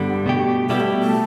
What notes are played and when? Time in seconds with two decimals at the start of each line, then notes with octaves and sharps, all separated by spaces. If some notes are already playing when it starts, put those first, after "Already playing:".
Already playing: G2 D3 G3 B3
0.26 B2 A3 G4
0.69 B2 G3 B3 E4 G4
0.80 A3
1.02 A3